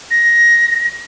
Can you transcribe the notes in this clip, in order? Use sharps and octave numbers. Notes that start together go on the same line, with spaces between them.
A#6